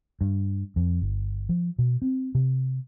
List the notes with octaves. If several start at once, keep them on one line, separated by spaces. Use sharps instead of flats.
G2
F2
G1
F3
B2
C4
C3